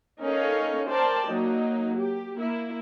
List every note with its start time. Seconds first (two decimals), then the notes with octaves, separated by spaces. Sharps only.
0.21 C#4 D#4 A4 A#4 C#5 F5
0.89 A#4 C5 D5 G5 A5
1.28 F#3 A#3 D#4
1.98 G4
2.37 A#3 E4